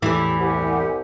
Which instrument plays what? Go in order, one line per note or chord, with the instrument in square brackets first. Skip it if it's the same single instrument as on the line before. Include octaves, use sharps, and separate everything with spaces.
[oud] E2 E3 [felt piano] A2 [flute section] G4 E6
[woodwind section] C2 [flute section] G4 F#5 G#5